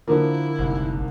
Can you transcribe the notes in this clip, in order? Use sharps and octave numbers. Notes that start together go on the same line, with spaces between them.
D3 F3 A#3 E4
F#1 C2 G#2